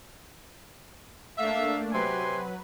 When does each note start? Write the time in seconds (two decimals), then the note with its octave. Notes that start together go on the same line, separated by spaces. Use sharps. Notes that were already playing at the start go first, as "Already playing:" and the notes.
1.38 A3 A#3 D4 E5 F5
1.93 C3 F#3 B4 G#5 C6